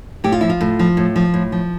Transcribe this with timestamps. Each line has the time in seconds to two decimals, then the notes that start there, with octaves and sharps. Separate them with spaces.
0.24 A2 G4
0.32 F4
0.41 F3 E4
0.50 F4
0.61 A2
0.79 F3
0.97 A2
1.16 F3
1.34 A2
1.52 F3